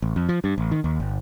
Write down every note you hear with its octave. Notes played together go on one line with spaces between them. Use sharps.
A1
F2
F3
G2
A1
D#3
D#2
G1